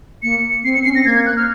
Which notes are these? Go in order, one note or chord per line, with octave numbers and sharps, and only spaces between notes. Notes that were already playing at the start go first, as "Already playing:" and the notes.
A#3 C#7
C4 C7
C#7
C#4 C7
C4 A#6
A#3 G#6
G#6
F#6
F6